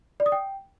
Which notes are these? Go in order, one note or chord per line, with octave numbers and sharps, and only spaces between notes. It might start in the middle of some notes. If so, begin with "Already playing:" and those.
D5
D#6
G5